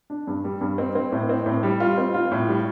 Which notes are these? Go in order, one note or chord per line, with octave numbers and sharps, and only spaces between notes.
D4
G2
G3
G2
C4
C4
A2
C4
A2
G3
F4
C4
F4
A2
G3